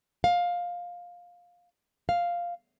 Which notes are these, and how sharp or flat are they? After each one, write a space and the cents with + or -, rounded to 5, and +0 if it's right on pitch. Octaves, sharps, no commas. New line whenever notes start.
F5 +15
F5 +0